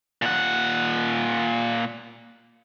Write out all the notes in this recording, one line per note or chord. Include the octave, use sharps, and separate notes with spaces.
A#2 F#5